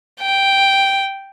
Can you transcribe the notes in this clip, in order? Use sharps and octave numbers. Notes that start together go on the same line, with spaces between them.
G5